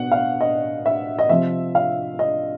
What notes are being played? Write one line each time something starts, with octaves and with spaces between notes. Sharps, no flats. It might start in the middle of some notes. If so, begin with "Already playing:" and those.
Already playing: B2 F#5
F5
D#5
E5
D#5
C3 F3 E5
F5
D#5